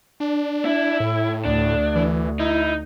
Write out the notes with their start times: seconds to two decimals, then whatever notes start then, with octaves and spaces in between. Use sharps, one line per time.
0.20 D4
0.65 E4
1.00 A2
1.45 D2 D4
1.95 E3
2.40 D#4 E4